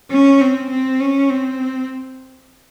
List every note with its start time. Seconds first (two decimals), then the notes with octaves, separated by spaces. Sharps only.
0.11 C#4
0.41 C4
0.71 C4
1.01 C#4
1.30 C4